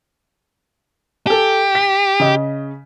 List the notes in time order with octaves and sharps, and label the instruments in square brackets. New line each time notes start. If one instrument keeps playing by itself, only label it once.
[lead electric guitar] G4 [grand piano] A4 G#5
[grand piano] B6
C#3 D#5